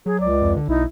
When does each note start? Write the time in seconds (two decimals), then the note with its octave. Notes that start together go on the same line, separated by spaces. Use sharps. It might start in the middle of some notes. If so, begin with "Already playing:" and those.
0.06 F#3 G#4
0.20 C#2 D5
0.42 F2
0.57 D3
0.68 B1 D#4 E4